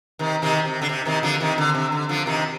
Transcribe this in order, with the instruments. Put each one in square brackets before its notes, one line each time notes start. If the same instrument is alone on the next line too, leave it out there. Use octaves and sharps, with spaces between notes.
[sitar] C3 D#3
C3 D#3
C3
D3
C3
C3 D#3
D3 F3
C3 D#3
D3
C3
D3
D3 F3
C3 D#3